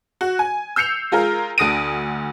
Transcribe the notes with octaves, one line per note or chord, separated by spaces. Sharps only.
F#4
G#5
E6 G6 C7 C#7 F7
G#3 F4 G#4 A#4
D2 D3 D#6 A#6 D7 D#7